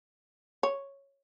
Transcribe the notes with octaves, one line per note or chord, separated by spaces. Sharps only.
C#5